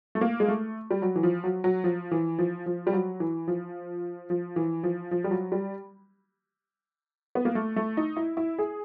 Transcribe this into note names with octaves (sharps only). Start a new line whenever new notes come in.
A3
A#3
G#3
A3
G3
F#3
E3
F3
F#3
F#3
F3
E3
F3
F3
G3
F#3
E3
F3
F3
E3
F3
F3
G3
F#3
G3
B3
A#3
A3
A3
D#4
E4
E4
G#4